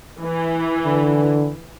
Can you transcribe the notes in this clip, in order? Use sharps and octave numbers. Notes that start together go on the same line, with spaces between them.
E3
D3